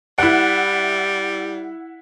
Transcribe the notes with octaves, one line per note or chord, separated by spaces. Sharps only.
G3 E4 F#5